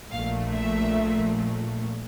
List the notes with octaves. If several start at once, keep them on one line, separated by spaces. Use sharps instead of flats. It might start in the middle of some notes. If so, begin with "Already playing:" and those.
A#1 A#2 F3 A3 F5
E5